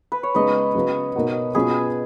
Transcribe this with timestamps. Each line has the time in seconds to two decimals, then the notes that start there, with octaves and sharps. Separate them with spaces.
0.12 B4
0.23 C#5
0.35 C#3 G#3 B3 D#4 B4 D#5
0.75 C#3 F#3 B3
1.15 B2 A#3 D#4 F#4
1.55 B2 F#3 C#4 F4 G#4 B4